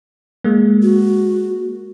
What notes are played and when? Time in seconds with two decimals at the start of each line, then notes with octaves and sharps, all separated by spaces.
0.44 G#3 A#3
0.82 F#4